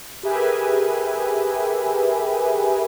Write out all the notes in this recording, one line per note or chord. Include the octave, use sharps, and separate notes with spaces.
G4 G#4 A#4 B4 E5 G#5